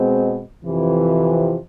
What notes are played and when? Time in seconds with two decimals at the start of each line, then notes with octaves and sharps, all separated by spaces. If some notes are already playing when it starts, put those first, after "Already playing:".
Already playing: B2 G#3 C4
0.65 F2 C3 E3